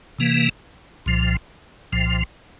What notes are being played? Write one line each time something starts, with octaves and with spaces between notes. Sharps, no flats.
C3 E3 A#3
C2 A#2 F3
C2 A#2 F3